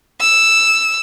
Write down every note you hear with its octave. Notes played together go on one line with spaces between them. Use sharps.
E6